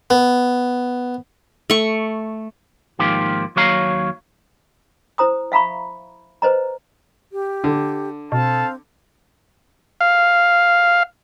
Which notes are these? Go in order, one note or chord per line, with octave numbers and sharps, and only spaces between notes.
B3
A3 C#6
G#2 D#3 F3 A#3 F4 G4
D#2 F#3 C#5 F5 A#5
E4 C5 A#5 D#6
E5 F5 A#5 B5 C#6
B4 C5 D#5 A#5
G4
D3
B2 C4 A4 F5 A5
F5